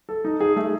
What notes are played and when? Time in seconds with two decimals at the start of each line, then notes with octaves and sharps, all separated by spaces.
0.09 A4
0.25 D#4
0.40 G#4
0.56 A3